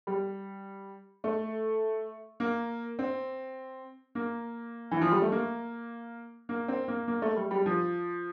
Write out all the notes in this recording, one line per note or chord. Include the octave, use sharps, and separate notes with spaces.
G3
A3
A#3
C4
A#3
E3
F3
G3
A3
A#3
A#3
C4
A#3
A#3
A3
G3
G3
F3